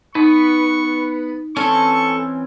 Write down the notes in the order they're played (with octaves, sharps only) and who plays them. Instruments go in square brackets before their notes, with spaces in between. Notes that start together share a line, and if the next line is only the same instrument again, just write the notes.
[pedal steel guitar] B3 B4 [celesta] D#4 [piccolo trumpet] C#6
[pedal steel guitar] E3 C4 C#4 [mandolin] A4 [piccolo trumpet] C#6